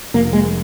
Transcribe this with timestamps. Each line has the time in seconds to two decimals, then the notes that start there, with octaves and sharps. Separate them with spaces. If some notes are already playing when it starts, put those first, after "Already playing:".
0.14 F1 A#3
0.33 G#3